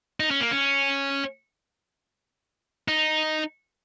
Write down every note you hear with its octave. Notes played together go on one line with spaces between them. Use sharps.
D#4
C#4
A#3
C#4
D#4